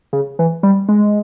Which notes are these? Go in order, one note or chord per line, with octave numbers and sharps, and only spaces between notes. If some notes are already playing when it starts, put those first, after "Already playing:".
C#3
E3
G3
G#3